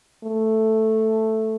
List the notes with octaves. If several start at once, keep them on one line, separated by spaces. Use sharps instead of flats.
A3